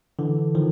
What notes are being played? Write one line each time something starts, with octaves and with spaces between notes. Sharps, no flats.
D3 E3
D#3 F3